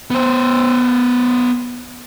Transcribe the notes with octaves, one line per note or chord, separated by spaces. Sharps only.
B3 C5